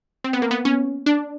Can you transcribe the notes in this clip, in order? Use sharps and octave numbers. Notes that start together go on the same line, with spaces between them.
C4
B3
A#3
B3
C#4
D4